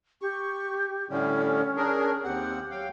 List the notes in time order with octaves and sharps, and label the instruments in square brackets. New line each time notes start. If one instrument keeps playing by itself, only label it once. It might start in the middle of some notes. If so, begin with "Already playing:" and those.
[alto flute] G4 [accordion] C#6
[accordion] A2 D3 G3 [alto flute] C#4
[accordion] D4 G#4 A#4
[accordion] D#2 C4 F#5 [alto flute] G4
[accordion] F#3 F5 G5